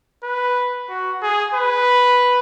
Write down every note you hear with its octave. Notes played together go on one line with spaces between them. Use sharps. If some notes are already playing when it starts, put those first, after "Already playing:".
B4
F#4
G#4
B4